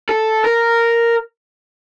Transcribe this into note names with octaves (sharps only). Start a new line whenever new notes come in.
A4
A#4